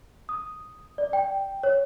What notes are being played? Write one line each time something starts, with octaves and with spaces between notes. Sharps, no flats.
D#6
D5
G5
C#5